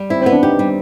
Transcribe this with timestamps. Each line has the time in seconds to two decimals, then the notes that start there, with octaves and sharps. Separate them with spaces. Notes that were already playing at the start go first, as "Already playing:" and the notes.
Already playing: G3
0.10 C4 E4
0.21 C4
0.26 B3
0.32 D4
0.43 D#4 G4
0.59 G3